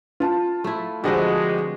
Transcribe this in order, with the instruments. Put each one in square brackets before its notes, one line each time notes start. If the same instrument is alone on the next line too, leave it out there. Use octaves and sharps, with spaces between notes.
[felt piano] F4 A5
[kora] A3 E4
[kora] D3 C4 B4 [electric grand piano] F3 F#4 G4 [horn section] G#3